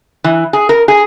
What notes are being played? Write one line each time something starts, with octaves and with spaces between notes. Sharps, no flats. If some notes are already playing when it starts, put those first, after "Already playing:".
E3
G#4
A#4
G#4